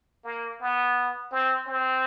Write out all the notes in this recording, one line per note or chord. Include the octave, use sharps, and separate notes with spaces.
A#3
B3
C4
C4